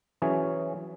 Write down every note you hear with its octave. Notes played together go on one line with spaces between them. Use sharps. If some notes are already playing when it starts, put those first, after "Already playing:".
E3 F#3 C#4 G#4